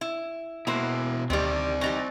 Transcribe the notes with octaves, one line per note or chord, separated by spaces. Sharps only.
E4
B2 A#3 E4 C5 B5 F#6
D2 D#3 G3 C4 D5
E3 D#4 G4 C#6 A6 A#6